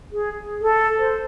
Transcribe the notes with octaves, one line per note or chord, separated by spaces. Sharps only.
G#4
A4
C5